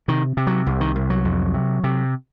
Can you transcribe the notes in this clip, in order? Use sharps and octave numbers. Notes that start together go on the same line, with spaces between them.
C3 D#3
C3
F#3
C2
D#3
C2
F#3
F2
C3
C3